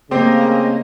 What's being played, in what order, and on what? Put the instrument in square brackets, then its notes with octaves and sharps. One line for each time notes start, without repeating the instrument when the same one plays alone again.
[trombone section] C#3 [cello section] A3 A#3 D#5 [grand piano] C4 G4